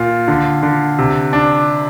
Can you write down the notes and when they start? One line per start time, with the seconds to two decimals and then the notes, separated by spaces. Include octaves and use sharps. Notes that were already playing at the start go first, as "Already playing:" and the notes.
Already playing: A#2 F4
0.28 D3
0.63 D3
0.98 C3
1.33 D4